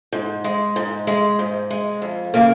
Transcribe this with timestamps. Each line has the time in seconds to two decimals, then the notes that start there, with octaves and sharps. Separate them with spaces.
0.13 G#2
0.44 G#3
0.76 G#2
1.07 G#3
1.39 G#2
1.71 G#3
2.02 F2
2.34 C#3 A#3